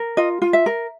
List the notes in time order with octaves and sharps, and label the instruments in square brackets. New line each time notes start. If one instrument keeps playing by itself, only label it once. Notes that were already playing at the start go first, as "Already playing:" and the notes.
Already playing: [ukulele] A#4
F4 D#5
F4
E5
A#4